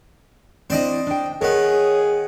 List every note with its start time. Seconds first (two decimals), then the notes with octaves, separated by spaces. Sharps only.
0.70 C4 D4 E4 C5 D5 D#5
1.07 D4 G5
1.42 D#3 B3 G#4 C#5